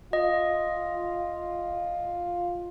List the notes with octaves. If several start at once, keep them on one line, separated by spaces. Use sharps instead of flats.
F4 D#5